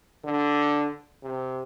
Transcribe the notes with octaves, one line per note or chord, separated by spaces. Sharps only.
D3
C3